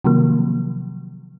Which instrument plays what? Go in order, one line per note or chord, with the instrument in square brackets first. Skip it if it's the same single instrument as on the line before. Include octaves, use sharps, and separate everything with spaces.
[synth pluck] C3 D#3 F3 F#3 A#3